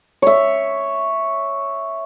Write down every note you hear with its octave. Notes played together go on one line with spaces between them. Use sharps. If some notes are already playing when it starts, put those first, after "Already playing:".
C#5 E5